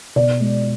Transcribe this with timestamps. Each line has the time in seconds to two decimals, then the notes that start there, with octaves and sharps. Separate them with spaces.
0.16 B2 D5
0.40 G#3